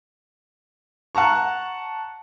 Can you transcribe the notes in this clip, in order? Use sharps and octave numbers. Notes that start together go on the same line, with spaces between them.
F#5 A5 A#5 C#6